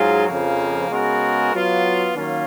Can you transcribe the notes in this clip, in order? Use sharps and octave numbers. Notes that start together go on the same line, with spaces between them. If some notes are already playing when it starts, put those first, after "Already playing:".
Already playing: G#2 F#3 F4 G#4
F2 C#3 F3 A#3
C#3 G#3 B3 F#4 A#4
F#3 B3 F4
D#3 F#3 A#3 C#4 F4